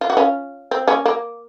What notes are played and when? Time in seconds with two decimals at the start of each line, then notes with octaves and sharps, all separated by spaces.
0.01 F4
0.10 F#4
0.17 C#4 F4
0.71 C4
0.87 A#3 C#4
1.06 A#3